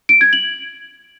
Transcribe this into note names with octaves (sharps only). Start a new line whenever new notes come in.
D7
G#6
F#7